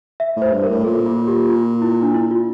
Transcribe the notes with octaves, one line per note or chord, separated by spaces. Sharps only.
E5
A2
C5
G2 C5
A#4
A2
A#2 A4
F4
G4
F4
E4
D4
E4
F4